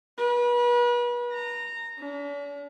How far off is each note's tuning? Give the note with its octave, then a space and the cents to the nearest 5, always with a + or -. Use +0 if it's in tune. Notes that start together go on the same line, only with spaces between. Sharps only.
B4 -35
A#5 -15
D4 -45